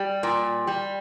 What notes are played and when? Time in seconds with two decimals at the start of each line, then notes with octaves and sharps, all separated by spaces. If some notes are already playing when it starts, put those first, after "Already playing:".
Already playing: G3
0.23 A#2
0.67 G3